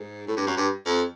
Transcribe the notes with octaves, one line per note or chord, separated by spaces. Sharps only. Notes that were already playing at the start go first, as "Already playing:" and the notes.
Already playing: G#2
A2
G2
F#2
G2
F2